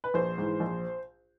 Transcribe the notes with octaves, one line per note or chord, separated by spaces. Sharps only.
B4
A#1 C5
G#2 E3
A#1